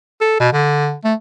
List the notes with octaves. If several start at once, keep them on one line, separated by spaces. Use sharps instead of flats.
A4
B2
D3
A3